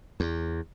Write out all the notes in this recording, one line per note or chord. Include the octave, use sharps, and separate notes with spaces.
E2